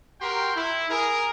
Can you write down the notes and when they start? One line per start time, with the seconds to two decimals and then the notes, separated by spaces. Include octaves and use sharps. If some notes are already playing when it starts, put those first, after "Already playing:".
0.21 F#4 G4 A#4 G5 C6
0.55 E4
0.89 G#4 A#4